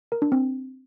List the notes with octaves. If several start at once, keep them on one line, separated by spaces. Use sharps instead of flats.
A#4
D4
C4